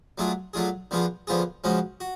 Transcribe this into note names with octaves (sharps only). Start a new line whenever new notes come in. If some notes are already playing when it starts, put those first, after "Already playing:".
F#3 A3 D4 F4 G#4
F#3 A3 D4 F4 G#4
D3 F3 B3 F4 G#4
D3 F3 B3 F4 G#4
C#3 F3 G#3 C#4 F#4
F#4